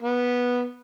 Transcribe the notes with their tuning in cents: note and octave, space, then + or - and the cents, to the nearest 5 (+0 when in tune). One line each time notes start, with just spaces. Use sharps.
B3 -10